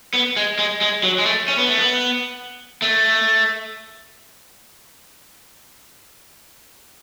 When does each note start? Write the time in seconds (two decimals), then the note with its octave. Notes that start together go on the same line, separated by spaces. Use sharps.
0.14 B3
0.37 G#3
0.59 G#3
0.81 G#3
1.03 F#3
1.18 G#3
1.26 A3
1.48 C#4
1.58 B3
1.69 A3
1.78 B3
2.82 A3